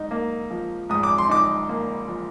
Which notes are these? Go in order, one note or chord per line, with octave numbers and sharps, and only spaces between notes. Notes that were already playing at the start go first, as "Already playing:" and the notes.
Already playing: G#2 D#4
A#3
F3
G#2 D#6
D6
C6
D#4 D6
A#3
F3